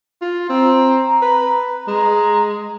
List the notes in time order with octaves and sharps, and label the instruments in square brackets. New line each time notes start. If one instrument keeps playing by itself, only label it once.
[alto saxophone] F4
[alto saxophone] C4 [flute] A#5
[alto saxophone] B4
[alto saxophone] G#3 [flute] A#5